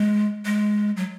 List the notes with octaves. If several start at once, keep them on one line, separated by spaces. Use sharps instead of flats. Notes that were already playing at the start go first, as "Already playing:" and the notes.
Already playing: G#3
G#3
F#3